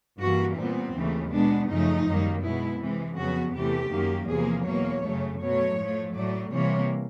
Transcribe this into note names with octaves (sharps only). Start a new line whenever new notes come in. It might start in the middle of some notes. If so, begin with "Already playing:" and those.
G2 E3 G3 A#3 F#4
A#2 G3 B3 C4
D#2 C#3 E3 A3
B2 G#3 B3 D4
F#2 C#3 F3 A3 D#4
F#2 D#3 G3 A#3
B2 G#3 B3 E4
C3 E3 G#3
F2 C#3 F#3 B3 F#4
E2 C3 E3 A3 G4
F#2 D#3 F#3 A#3
E2 C3 F3 A#3 G#4
E2 B2 F#3 A#3 C#5
F#2 C#3 F#3 A3
B2 F#3 A3 C#5
A2 F3 A3
A2 F#3 A3 D5
C3 E3 G3 A#3 C#5